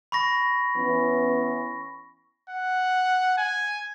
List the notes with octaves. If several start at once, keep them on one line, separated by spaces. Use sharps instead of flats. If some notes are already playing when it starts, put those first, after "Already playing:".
B5 C#6 A#6
E3 B3 C#4
F#5
G#5